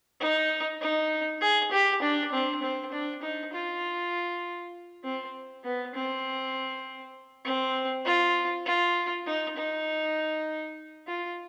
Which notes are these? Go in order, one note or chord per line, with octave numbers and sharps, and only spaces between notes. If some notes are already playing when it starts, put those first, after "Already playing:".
D#4
D#4
G#4
G4
D4
C4
C4
D4
D#4
F4
C4
B3
C4
C4
F4
F4
D#4
D#4
F4